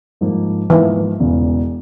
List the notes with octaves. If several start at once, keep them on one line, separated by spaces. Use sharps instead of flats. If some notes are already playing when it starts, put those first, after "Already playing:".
G#2 F3 A#3
G#2 E3 F3 A#3
E1 E2 C#3